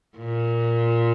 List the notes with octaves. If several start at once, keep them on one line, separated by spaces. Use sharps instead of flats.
A#2